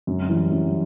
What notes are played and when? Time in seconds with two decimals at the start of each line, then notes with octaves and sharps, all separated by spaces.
0.07 F#2
0.29 E3 G3
0.50 F#2